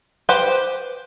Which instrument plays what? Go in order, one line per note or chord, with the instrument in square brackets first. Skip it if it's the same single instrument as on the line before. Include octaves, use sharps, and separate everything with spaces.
[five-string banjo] G4 B4 C5 F#5